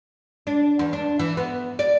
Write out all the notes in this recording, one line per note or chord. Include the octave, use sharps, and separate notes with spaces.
D4
E2
D4
E3
B3
D5